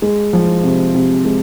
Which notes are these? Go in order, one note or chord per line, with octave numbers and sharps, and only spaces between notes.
G#3
F3
C3
C3
G#3